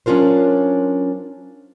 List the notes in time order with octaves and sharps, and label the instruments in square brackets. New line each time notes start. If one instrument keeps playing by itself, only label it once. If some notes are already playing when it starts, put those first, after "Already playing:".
[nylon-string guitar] F#3 C#4 D4 F4 A#4 C5